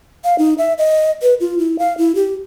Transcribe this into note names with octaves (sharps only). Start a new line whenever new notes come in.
F5
D#4
E5
D#5
B4
F4
E4
F5
E4
G4